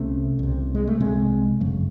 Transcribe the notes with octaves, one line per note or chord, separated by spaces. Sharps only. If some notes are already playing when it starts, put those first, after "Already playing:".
Already playing: C2 C3 A3 C#4
C2 C3
G#3
A3
C2 C3 G#3 C4
G#1 F#2 C#3 F#3 A3